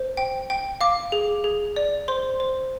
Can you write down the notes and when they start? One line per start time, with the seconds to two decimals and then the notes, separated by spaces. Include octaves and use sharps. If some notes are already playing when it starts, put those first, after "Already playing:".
Already playing: C5
0.17 G5
0.50 G5
0.81 F5 D6
1.12 G#4
1.44 G#4
1.76 D5
2.08 C5 C6
2.40 C5